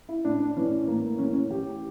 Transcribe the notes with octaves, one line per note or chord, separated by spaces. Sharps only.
E4
A2 D4
D4
E3 C#4
A2 A#3
E3 C#4
A#3
C#4
E3 G4